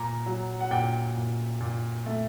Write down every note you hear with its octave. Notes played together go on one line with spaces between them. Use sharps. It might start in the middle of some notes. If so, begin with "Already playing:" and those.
Already playing: A#2 A#5
F#3
F#5
A#2 G5
A#2
A#2
A3